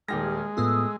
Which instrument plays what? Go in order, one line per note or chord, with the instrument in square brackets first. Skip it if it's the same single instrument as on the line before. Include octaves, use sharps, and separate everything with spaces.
[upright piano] D#1 G4 A#6 [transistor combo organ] G#3 [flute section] F6
[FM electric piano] A2 B3 F4 [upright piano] A3 [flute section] D#6 E6